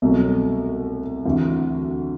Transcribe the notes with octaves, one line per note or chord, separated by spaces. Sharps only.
C2 B2 F#3 A3
D2 C3 E3